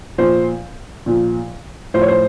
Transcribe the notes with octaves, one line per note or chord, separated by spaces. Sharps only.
A#2 F3 C5
A#2 F3
A2 F3 C5
C#5
C5